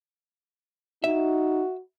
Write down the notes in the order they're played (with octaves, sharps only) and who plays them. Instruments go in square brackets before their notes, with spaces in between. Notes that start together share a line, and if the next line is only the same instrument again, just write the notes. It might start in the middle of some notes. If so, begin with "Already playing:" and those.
[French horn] D#4 [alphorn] F#4 [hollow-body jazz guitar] E5